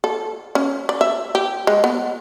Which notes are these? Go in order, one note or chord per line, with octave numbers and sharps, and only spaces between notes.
A4
C#4
D5
E5
G4
G#3
B3